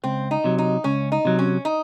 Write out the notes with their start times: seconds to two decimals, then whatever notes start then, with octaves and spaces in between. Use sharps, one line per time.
0.04 C#2 C4
0.31 D#4
0.44 C3 F#3
0.58 D#4
0.84 C#2 C#4
1.12 D#4
1.25 C3 F#3
1.39 C#4
1.65 D#4